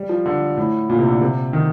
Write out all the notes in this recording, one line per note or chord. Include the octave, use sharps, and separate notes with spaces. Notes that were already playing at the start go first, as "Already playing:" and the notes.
Already playing: G3
F3
D3
A2
A#2
C3
D3
C3
D#3